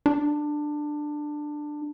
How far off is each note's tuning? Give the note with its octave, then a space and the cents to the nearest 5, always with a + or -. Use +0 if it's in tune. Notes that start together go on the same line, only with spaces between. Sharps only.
D4 +15